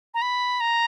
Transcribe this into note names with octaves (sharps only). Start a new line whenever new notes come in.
A#5
B5
A#5